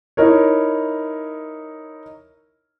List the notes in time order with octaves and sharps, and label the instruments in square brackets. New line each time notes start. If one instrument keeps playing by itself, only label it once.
[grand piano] D#4 E4 A#4 C#5